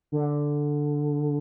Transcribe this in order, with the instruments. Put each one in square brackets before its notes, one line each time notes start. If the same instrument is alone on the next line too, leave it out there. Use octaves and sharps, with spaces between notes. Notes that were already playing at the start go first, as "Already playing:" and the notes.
[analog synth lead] D3